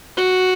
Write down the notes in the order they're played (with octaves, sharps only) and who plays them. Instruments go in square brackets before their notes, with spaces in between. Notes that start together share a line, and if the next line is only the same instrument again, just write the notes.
[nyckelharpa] F#4